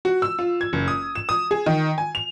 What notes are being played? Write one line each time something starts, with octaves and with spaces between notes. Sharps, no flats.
F#4
E6
F4
G#6
F#1
D#6
E7
D#6
G#4
D#3
G#5
F7